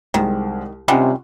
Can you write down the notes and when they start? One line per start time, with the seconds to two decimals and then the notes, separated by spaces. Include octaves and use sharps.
0.14 C2 D#3 G#3 C5
0.88 C3 D#3 G3 G#3 C#4 F4 F#5